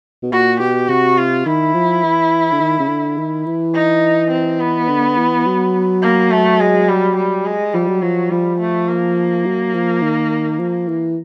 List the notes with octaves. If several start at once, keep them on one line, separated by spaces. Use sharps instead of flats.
B2
A#2 F#4
B2 G4
C3 F#4
F4
D#3 E4
F3
E3
D3
D#3
C#3
D3
D#3
E3
D#4
C4
B3
D3
E3
F#3
A#3
A3
G#3
G3
G3
G#3
F3 G3
F#3
F3 F#3
F3 G3
A3
A#3
F#3
F3
D#3
F3
E3